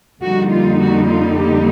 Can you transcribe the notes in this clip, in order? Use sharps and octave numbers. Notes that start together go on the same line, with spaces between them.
F2 D3 G3 A#3 D#4 F#4
F4
F#4
F4
G4